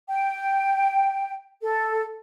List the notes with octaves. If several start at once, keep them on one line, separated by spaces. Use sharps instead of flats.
G5
A4